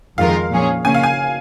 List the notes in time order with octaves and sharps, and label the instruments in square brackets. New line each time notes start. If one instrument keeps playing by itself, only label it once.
[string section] F2 D#3 G#3 F4 A#4 [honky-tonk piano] F5
[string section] A#2 F3 C#4 G#4 C#5
[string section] C#3 A#3 C#4 [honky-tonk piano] G#5
[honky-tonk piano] F5
G#5